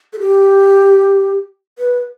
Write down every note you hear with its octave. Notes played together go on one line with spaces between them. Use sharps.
A4
G4
B4